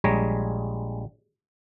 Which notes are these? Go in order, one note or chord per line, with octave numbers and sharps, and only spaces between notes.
A#1 G3 G#3 C#5 A#5